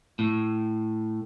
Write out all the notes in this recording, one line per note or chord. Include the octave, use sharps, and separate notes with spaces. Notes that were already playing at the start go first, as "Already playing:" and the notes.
A2